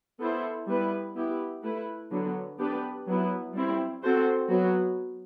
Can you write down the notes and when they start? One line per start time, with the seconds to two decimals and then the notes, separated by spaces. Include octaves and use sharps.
0.20 B3 E4 A4 C5
0.67 G3 B3 E4 B4
1.16 B3 E4 G4
1.63 A3 E4 B4
2.11 D3 F#3 B3
2.59 B3 D4 G4 B4
3.07 F#3 B3 E4
3.54 G3 C4 E4
4.02 C4 F#4 A4 C5
4.49 F#3 B3 F#4